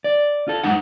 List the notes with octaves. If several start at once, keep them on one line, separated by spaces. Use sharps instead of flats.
D5
F4 A4
F#2 G#3 D#4 F#5